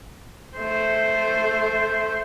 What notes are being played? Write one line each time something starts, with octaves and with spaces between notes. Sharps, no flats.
A3 C5